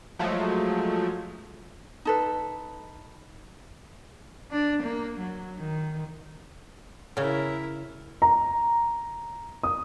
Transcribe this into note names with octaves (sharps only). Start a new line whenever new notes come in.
F3 F#3 G#3 A3
D#4 A4 B4
D4
A#3
F#3
D#3
C#3 C#4 E4 A#4
A#5
D#6